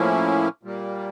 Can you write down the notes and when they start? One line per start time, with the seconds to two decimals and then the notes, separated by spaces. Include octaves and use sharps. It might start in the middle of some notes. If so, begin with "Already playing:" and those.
Already playing: A2 F3 A#3 C#4 E4
0.63 A#2 G3 A#3